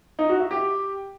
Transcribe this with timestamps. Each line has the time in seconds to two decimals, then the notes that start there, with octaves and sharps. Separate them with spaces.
0.19 D#4
0.29 F#4
0.40 E5
0.51 G4